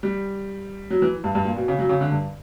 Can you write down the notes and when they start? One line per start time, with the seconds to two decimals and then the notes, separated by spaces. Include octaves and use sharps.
0.03 G3
0.90 F#3
1.02 E3
1.24 G2
1.35 G2
1.45 A#2
1.57 B2
1.68 C#3
1.79 F#3
1.89 C#3
2.01 D3
2.12 G2